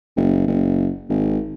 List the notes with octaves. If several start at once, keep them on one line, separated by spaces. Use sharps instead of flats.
F#1
F#1
G#1